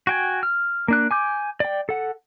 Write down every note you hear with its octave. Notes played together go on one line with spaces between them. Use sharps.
F#4 G5 G#5
F6
A#3 D4 F#6
G#5 D6 G6
D5 G5
A4 F#5